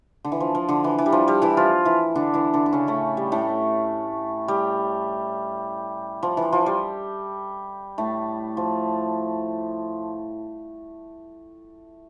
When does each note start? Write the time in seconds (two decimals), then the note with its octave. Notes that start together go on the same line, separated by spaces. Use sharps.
0.25 D3
0.32 E3
0.40 F3
0.55 F3
0.69 D3
0.84 E3
0.99 E3
1.06 G3
1.12 F3
1.28 G3
1.42 E3 E4
1.57 F3 F4
1.85 E3 E4
2.15 D3 D4
2.34 E3 E4
2.53 D3 D4
2.66 D4
2.73 C#3 C#4
2.87 A2 A3
3.17 G3
3.32 A2 A3
4.48 G3
6.23 F3
6.37 E3
6.52 F3
6.66 G3
7.98 A2 A3
8.57 F3